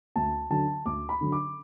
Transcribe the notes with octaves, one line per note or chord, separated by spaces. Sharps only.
D2 A5
D3 F#3 A5
D2 D6
B5
D3 F#3
D6